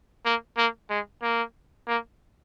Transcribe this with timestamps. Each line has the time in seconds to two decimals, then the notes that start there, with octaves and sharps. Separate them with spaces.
0.25 A#3
0.57 A#3
0.90 G#3
1.23 A#3
1.88 A#3